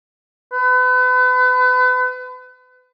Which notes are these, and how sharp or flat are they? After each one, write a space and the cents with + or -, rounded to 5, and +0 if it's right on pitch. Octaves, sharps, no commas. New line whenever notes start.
B4 +35